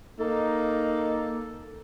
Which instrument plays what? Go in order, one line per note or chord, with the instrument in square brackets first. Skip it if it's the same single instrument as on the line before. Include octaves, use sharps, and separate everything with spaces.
[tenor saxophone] A#3 [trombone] D#4 [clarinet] A4